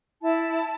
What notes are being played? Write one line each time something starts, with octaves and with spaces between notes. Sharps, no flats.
E4 A5